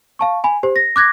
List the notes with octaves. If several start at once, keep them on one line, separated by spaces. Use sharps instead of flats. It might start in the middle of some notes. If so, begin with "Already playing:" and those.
F5 A5 C#6
G#5 B5
G4 C5
A#6
D6 F#6 G#6 A#6